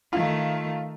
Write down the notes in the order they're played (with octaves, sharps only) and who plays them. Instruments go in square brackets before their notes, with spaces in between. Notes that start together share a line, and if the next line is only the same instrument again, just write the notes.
[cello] D#3 A3 [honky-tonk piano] F4